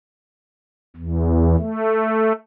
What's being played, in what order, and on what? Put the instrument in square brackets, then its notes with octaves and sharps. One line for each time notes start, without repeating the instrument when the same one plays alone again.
[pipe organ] E2
A3